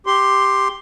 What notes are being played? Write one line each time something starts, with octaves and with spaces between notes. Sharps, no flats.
G4 C6